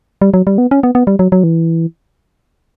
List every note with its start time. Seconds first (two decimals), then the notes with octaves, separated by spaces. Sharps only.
0.22 G3
0.34 F#3
0.47 G3
0.58 B3
0.71 C#4
0.83 B3
0.95 B3
1.07 G3
1.19 F#3
1.32 F#3
1.44 E3